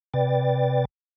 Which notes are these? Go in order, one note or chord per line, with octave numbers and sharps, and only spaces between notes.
C3 B4 D5 G5 A6